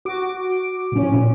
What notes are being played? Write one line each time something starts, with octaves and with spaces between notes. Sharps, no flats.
F#4 D6 D7
A2 C3 F3 C#4
A#2